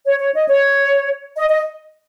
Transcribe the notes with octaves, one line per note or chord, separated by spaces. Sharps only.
C#5
C#5
D#5
C#5
D#5
D#5